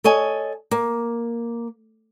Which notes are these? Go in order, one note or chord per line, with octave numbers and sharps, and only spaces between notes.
A4 C#5 D#5 G#5
A#3